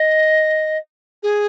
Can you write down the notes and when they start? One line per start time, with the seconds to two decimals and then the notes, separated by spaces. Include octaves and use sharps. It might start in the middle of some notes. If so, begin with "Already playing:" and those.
Already playing: D#5
1.23 G#4